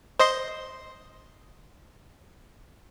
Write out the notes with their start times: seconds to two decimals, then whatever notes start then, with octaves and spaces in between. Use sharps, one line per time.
0.19 C5 D#5 C6